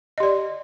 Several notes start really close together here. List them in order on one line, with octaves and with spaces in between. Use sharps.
D#5 G4 D5